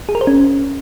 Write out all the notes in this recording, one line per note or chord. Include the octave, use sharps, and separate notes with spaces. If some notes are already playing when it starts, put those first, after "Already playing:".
G#4
A#4
C5
C#4